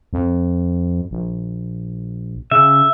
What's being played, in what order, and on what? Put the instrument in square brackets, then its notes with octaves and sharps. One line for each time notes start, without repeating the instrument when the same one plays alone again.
[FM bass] F2
A#1
[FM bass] C#3 [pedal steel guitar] E5